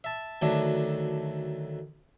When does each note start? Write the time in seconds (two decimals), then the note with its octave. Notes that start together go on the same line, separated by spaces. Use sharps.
0.04 E5 A5
0.42 D2 D#3 F#3 A3 D4 E5